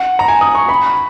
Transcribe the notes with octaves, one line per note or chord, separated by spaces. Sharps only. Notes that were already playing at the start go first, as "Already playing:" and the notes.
Already playing: F#5
A#5
G#5
D#6
C#6
B5